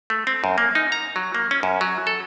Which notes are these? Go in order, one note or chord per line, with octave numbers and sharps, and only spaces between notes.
A3
C4
F#2
A#3
D#4
A#5
F#3
A#3
C#4
F#2
F#3
A4